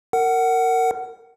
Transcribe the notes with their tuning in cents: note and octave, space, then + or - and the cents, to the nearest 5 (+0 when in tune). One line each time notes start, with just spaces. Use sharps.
A#4 -20 F#5 +15